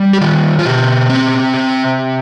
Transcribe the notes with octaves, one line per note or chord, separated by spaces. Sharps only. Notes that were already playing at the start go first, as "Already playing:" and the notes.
Already playing: G3
G4
D#3 F4
F4
B2 G4
C4
C3